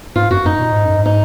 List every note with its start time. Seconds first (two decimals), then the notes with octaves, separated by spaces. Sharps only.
0.15 G#2 F4
0.30 F#2 F#4
0.45 F#2 D#4
0.59 A#2
0.72 G#2
0.85 F#2
0.97 G#2
1.06 D#4